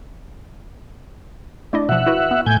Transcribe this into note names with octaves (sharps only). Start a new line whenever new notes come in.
A3 D4 E4 D#5
B2 F3 E5 F#5
E4 F#4 B4
B3
A2 G#5 G6